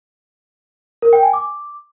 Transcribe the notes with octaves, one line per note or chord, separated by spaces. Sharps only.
A#4
G5
G#5
D6